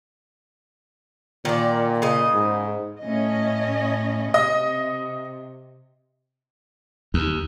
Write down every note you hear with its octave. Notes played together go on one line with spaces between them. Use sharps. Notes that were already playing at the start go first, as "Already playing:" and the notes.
A#2 D#3 D5
C#3 D#5
G#2
A2 C#4 D#5
C3 D#5
D#2